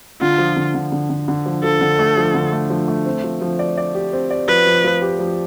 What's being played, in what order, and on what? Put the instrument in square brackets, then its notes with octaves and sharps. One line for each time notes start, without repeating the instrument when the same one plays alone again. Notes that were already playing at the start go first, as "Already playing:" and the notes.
[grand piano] D3 [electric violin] F4
[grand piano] F3
D3
D3
D3
D3
D3
F3
[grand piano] F3 [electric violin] A4
[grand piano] D3
A3
F3
D3
A3
F3
A3
C4
F3
F3
D5
D5
G4
C4
D5
[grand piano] F3 [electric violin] B4
[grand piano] F3
F3
G4
F3